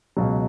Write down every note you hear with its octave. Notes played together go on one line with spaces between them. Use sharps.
C#2 B2 F#3